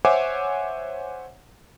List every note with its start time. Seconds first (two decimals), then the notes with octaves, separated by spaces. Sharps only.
0.05 C5 C#5 E5 F#5 G#5 D6